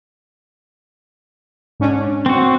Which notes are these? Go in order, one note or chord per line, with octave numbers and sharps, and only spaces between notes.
G#2 C#4 D4
C4 F#4